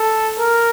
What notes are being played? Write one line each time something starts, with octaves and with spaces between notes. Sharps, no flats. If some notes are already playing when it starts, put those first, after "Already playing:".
Already playing: A4
A#4